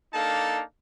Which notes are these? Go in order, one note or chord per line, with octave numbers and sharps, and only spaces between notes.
A#3 D4 D#4 A4 F5 A5